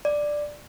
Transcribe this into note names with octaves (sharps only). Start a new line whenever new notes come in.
D5